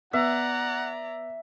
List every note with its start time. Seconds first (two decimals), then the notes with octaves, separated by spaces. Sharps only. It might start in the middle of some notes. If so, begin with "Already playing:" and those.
0.13 B3 D5 E5 F#5 A#5